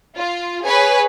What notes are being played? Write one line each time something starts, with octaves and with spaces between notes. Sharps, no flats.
F4
G#4 B4 C#5 G#5